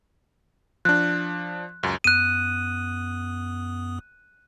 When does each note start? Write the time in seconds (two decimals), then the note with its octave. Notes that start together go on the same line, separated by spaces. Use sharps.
0.85 F3 D4 F#6
1.83 C#2 F#2
2.04 F#2 B3 D#6 F#6 D#7